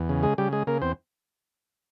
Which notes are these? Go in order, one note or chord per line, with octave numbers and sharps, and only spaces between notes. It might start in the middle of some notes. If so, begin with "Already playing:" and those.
Already playing: E2
C#3
G#3 G#4
C#3 G3 G4
G#3 G#4
C#3 A#3 A#4
E2 C4 C5